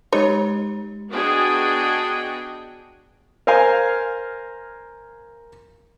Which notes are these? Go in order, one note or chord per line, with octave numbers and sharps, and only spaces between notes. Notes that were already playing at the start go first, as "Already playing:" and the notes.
G#3 D#4 G4 C#5
B3 D4 F#4 G#4 D#5 G5
A#4 C5 F5 G#5